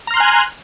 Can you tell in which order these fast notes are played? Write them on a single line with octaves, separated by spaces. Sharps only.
A#5 F6 C6 F#6 G#5